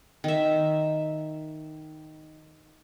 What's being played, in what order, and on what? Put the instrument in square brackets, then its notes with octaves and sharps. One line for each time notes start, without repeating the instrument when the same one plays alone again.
[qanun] D#3 E5